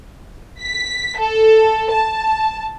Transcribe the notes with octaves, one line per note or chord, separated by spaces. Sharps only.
B6
A4
A5